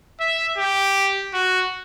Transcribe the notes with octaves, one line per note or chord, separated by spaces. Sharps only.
E5
G4
F#4